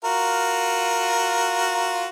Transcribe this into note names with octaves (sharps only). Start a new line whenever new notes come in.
F4 F#4 A#4